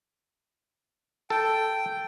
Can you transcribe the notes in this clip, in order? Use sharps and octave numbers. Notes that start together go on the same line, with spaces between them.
A4 G5